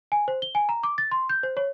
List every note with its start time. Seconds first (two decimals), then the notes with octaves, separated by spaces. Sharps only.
0.12 G#5
0.28 C5
0.42 G7
0.55 G#5
0.69 A#5
0.83 D6
0.98 A6
1.12 C6
1.29 G6
1.43 C5
1.57 C#5